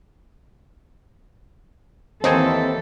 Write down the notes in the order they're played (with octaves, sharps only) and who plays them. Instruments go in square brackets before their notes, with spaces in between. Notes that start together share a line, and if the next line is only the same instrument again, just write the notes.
[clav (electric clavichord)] D#2 D#4 G#5 [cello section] E3 A4 [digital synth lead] C4